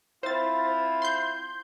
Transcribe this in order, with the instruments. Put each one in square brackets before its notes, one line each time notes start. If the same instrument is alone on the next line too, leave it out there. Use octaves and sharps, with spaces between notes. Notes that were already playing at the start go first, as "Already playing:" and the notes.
[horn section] C4 E4 F4 [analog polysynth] C5 A6
[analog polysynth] C6 G6